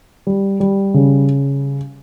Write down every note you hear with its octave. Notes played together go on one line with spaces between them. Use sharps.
G3
G3
C#3